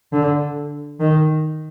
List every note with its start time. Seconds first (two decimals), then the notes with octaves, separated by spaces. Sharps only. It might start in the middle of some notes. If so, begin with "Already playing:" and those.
0.13 D3
1.00 D#3